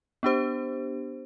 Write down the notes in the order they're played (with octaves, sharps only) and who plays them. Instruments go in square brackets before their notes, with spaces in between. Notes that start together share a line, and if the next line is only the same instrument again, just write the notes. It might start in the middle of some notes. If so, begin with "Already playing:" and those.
[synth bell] B3 D4 G4 C5